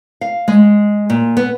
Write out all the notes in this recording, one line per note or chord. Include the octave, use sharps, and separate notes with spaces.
F5
G#3
A#2
B3